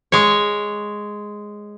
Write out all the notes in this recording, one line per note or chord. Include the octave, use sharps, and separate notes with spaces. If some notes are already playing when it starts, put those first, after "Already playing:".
G#3 C#5